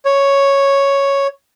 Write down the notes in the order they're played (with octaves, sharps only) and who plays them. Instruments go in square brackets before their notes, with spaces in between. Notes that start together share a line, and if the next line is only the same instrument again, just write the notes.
[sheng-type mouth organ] C#5